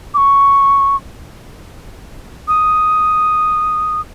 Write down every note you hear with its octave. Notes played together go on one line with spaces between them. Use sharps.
D6
C#6
D#6